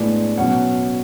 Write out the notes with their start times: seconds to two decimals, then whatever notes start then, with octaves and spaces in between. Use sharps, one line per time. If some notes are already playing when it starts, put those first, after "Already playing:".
Already playing: A2 G#3 B3 D4
0.38 B2 F#3 C#4 F#5